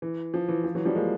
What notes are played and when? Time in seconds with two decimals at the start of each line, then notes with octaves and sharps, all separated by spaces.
0.02 E3
0.34 F3
0.49 E3
0.64 F3
0.75 E3 F#3
0.85 F3 G3
0.95 G#3 A#3